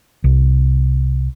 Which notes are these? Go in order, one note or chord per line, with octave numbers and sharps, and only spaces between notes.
C2